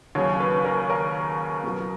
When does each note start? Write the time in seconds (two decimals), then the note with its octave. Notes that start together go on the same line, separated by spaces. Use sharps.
0.15 D#2 C#3 F#3 C#5
0.40 B4
0.64 A#4
0.90 A#4
1.64 C#2 B2 F#3